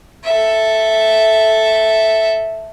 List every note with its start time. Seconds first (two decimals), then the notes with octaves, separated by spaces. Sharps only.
0.24 A4 E5